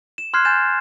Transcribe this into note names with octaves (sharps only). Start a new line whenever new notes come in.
E7
C6 F6 F#6 G#6 C7
G#5 G6 A6 E7